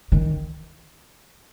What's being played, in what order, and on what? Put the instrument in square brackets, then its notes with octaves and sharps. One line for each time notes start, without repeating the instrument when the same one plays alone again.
[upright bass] D#3